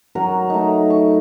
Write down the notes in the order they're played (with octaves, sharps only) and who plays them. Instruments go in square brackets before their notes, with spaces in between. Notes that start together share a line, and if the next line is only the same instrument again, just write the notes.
[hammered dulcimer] F#3 F#4 A#4
A3 D#4
C#6